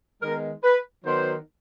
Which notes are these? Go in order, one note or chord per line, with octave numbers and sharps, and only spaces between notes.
D#3 G#3 B3 A#4
B4
D#3 F#3 B3 C5